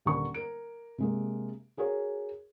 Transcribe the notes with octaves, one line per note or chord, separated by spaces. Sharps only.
D#1 D3 A#4 C#6
A#4 D7
C3 G#3 A#3
F#4 G#4 A#4 C#5